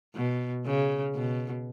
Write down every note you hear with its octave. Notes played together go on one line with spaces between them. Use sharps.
B2
C#3
B2